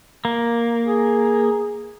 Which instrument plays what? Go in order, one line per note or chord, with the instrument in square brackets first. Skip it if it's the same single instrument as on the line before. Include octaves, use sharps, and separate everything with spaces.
[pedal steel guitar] A#3
[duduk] G#4